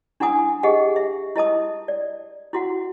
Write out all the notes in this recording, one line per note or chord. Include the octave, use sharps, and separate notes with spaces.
D4 E4 F#5 G#5 D#6
G4 G#4 D#5 F#5
E5
E4 D#5 A5 D#6
D5
E4 F#4 F#5